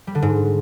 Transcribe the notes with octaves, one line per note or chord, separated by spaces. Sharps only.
G3
D3
G#2